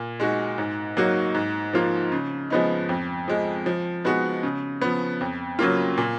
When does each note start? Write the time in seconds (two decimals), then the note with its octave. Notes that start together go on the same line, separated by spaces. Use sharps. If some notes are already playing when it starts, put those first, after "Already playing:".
Already playing: A#2
0.20 G#3 D#4 F#4
0.58 G#2
0.97 F#3 A#3 D#4 F#4
1.35 G#2
1.73 F3 A#3 F4
2.12 C#3
2.50 F3 G#3 B3 D#4
2.89 F2
3.28 F3 G#3
3.66 F3
4.05 G#3 B3 D#4 F#4
4.43 C#3
4.82 F3 B3
5.21 F2
5.59 C#3 F#3 A#3 F4
5.98 A#2